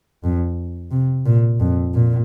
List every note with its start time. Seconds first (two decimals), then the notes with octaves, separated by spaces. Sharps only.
0.24 F2
0.91 C3
1.26 A#2
1.60 F2
1.94 A#2